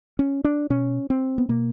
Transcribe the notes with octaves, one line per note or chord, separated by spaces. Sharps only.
C#4
D4
B2 C#4
C4
B3
B2 A#3